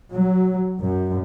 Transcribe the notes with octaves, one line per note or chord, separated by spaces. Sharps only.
F#3
F#2